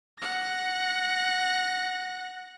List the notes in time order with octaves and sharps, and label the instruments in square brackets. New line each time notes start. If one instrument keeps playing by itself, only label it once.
[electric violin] F#5 A#6